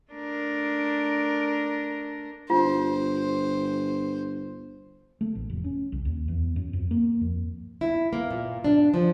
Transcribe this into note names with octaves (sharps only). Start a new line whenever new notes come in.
A3 D4 A#4
G1 F4 C5
A3
A1
F1
C#4
C2
D#2
E2
F#2
F2
A#3
F2
E4
A#3
A#2
D4
F3